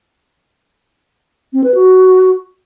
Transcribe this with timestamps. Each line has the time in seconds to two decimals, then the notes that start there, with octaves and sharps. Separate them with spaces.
1.53 C4
1.64 B4
1.75 F#4